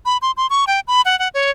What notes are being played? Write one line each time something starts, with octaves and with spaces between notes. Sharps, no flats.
B5
C6
C6
C#6
G5
B5
F#5
F#5
C#5